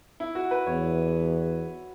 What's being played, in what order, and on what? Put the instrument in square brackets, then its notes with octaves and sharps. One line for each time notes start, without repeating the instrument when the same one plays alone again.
[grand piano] E4
F#4
B4
[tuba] E2 [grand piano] C#5